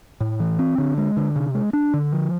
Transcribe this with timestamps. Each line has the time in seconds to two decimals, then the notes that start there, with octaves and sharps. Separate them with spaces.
0.21 A2
0.40 E3
0.59 C4
0.78 D3
0.98 G#3
1.17 D3
1.36 C3
1.55 G#3
1.73 D4
1.94 D3
2.13 F3